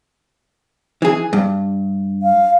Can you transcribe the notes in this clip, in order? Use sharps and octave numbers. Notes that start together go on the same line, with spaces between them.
E3 G#4
G2
F5